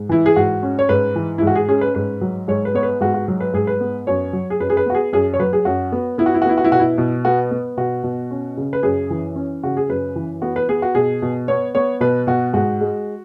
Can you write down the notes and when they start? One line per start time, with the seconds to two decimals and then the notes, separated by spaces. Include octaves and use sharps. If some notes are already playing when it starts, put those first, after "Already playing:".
Already playing: G#2
0.09 E3 E4
0.26 G#4
0.36 G#2 F#4
0.63 C#4
0.79 C#5
0.89 G#2 B4
1.16 E3
1.38 E4
1.42 G#2
1.47 F#4
1.55 G#4
1.68 C#4 G#4
1.81 B4
1.95 G#2 B4
2.21 F#3
2.48 G#2 C#5
2.65 B4
2.74 B3 C#5
2.83 B4
3.01 G#2 F#4
3.14 F#4
3.28 F#3
3.40 B4
3.53 G#2 G#4
3.67 B4
3.80 B3
4.07 F#2 C#5
4.33 F#3
4.50 G#4
4.60 F#2 B4
4.70 G#4
4.77 B4
4.86 B3 F#4
4.95 G#4
5.13 F#2 G#4
5.34 C#5
5.40 F#3 B4
5.53 G#4
5.65 F#2 F#4
5.92 B3
6.18 B3 E4
6.26 F#4
6.34 E4
6.42 F#4
6.46 B3 E4
6.57 F#4
6.64 E4
6.72 B2 F#4
6.80 E4
6.98 B2
7.25 B3 F#4
7.51 B3
7.77 B2 F#4
8.04 B2
8.31 C#4
8.57 C#3
8.73 B4
8.83 F#2 G#4
9.10 E3
9.36 C#4
9.63 C#3 F#4
9.77 G#4
9.89 F#2 B4
10.16 E3
10.42 B3 F#4
10.56 B4
10.69 B3 G#4
10.82 F#4
10.95 B2 G#4
11.22 B2
11.48 B3 C#5
11.75 B3 C#5
12.00 B2 B4
12.27 B2 F#4
12.53 G#2 F#4
12.81 G#3